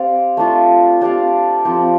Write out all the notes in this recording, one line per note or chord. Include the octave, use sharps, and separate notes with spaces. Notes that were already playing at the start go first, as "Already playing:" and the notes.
Already playing: C4 G4 D5 F5
A3 D4 F4
D4 G4 D5 F5
F3 C4 G4